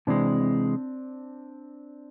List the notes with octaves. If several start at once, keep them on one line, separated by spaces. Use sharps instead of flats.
C3 E3 G#3 C4 D4